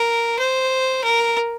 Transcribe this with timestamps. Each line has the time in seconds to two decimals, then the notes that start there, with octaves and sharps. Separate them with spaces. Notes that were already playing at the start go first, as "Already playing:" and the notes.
Already playing: A#4
0.39 C5
1.04 A#4